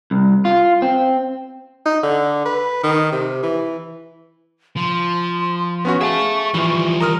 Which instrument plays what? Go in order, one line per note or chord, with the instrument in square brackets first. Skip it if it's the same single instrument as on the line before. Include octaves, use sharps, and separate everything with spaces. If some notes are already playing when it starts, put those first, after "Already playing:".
[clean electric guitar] C2
F4
C4
[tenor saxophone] D#4
D3
B4
D#3
C3
E3
[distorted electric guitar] F3 [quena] C6
[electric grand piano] B3 C#4 F#4 [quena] C#6
[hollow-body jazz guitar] G#4 [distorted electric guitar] E5 A5 [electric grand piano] F5
[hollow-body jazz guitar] E3 F3 [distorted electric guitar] G3 F4
[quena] A#4 [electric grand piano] A#5 D#6 F6